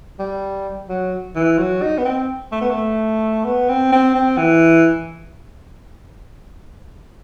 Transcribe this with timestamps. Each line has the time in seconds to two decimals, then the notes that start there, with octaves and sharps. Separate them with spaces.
0.19 G3
0.89 F#3
1.35 E3
1.58 F#3
1.82 D#4
1.98 B3
2.05 C4
2.52 A3
2.61 B3
2.70 A3
3.45 B3
3.69 C4
3.92 C4
4.15 C4
4.38 E3